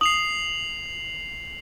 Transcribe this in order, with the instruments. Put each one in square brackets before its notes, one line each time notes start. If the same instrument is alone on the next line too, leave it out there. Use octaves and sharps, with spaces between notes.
[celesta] D#6 [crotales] C7 F7 F#7